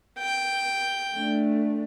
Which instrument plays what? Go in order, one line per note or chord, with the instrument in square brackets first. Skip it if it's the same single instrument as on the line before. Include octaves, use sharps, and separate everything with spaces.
[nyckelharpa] G5
[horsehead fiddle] A3 D4